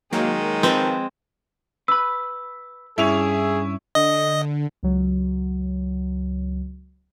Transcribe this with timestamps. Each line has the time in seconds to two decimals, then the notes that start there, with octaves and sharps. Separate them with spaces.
0.13 D#3 F#3 G#3 A#3
0.63 F3 C4 B4 A5
1.88 B4 B5 E6
2.98 G2 C#4 E4 G#4 F7
3.95 D3 D#5
4.83 C#2 F#3